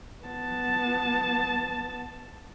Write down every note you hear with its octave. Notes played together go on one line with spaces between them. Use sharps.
B3 A5